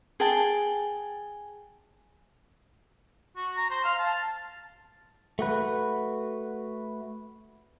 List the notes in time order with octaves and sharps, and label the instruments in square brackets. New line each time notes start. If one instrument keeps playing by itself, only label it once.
[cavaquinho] G#4 G5 A5
[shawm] F#4
A#5
C5
F5
A5
[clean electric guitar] A3 F#4 B4